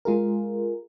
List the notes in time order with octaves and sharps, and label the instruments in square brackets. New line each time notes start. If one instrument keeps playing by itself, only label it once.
[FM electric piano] G#3 F4 G#4 A#4